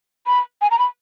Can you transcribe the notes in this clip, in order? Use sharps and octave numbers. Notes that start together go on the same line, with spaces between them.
B5
G#5
A#5
B5